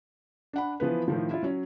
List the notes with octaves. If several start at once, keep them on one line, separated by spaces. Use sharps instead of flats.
D4 F#5 B5
E3 F3 B3 B4
A2 D#3 F3
E4 F4
F#3 C#4